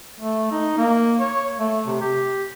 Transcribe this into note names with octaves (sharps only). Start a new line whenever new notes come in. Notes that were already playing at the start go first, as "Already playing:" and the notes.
A3
D#4
A#3
C#5
A3
C3
G4